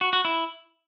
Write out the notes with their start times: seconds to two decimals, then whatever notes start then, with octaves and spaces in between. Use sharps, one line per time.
0.01 F#4
0.13 F#4
0.25 E4